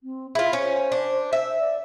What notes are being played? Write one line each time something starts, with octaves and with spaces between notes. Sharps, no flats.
C4
E4 F4 G#4
C#4 C5
D4
E5
D5